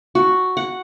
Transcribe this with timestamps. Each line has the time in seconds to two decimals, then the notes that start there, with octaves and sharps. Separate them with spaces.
0.15 F#4
0.57 F#5